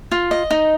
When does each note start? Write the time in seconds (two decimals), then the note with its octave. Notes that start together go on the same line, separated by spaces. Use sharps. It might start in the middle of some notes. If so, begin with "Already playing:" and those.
0.12 F4
0.31 D#5
0.51 D#4